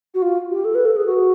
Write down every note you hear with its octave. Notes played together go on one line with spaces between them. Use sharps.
F#4
F4
G4
A4
B4
A4
G#4
F#4